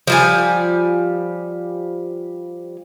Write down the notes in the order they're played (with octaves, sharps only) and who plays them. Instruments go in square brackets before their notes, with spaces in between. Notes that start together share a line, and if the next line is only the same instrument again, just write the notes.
[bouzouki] F3 G3 G#5